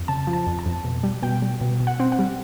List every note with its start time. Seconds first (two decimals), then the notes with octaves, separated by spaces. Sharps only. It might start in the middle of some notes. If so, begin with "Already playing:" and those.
Already playing: F2
0.08 C#3 A5
0.27 F3
0.33 A5
0.47 F2
0.59 A5
0.65 F2
0.85 B2
1.03 G3
1.22 B2 G5
1.42 G3
1.61 B2
1.80 B2
1.87 F#5
2.00 C4
2.12 F#5
2.19 G3